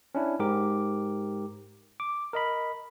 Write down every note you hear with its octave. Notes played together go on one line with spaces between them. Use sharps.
C#4 D4 E4
G#2 G4 A#4 D6
D6
A#4 D#5 B5